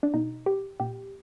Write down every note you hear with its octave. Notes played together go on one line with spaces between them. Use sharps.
D4
B2 D#4
G4
A#2 G4